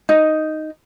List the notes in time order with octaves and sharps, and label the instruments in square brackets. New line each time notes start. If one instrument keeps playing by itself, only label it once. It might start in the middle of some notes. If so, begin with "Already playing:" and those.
[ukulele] D#4